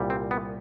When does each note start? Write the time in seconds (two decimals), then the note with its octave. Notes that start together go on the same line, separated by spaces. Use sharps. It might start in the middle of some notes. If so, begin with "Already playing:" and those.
Already playing: C2 A#2 G3
0.10 C4
0.31 B3